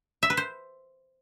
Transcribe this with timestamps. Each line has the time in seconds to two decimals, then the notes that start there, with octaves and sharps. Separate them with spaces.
0.23 E5
0.30 B4
0.37 C5